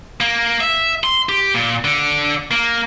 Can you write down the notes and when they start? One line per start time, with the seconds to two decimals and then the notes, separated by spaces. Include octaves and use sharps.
0.21 A#3
0.61 E5
1.04 C6
1.29 G4
1.54 A#2
1.84 D3
2.51 A#3